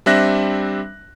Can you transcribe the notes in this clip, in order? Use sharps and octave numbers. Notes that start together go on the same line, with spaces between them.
G3 C4 D4 E5 F#6 A#6